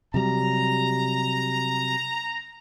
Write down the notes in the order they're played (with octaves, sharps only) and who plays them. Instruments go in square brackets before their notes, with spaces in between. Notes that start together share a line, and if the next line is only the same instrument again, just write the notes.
[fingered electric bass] C3 F#3 G3 [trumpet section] A#5